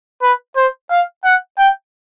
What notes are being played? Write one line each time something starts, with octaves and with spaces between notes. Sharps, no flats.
B4
C5
F5
F#5
G5